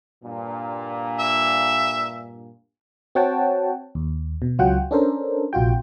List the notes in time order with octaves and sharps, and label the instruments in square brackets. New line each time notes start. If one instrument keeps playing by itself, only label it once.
[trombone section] G2 A#2
[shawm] E5
[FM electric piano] C4 F#4 C#5 F#5 G5 A5
D#2
B2
C#2 F#3 F4 F#4 F#5 G5
C#4 D4 A4 A#4 C5
A#1 C3 F4 F#4 G5